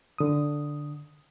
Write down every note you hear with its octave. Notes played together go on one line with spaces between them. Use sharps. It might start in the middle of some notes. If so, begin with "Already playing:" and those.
D3 D#6